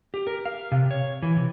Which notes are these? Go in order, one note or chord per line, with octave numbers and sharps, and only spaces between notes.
G4
A#4
F5
C3
C#5
E3
C3